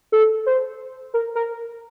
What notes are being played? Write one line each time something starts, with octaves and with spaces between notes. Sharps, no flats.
A4
C5
A#4
A#4